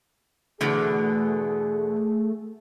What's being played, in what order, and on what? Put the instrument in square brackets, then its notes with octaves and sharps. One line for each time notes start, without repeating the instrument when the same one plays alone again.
[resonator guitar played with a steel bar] E2 B2 D3 [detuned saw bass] A3 [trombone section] G#4